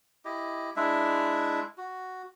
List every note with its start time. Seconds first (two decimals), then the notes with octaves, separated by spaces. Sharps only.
0.25 E4 G4 D#5
0.76 G#3 D4 E4 E5
1.78 F#4